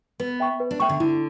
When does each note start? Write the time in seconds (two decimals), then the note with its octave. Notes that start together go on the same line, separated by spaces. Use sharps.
0.20 B3 B4
0.40 E5 G5 C#6
0.60 B4
0.71 D4
0.80 A3 E5 G5 C#6
0.89 D3
1.00 D3 E4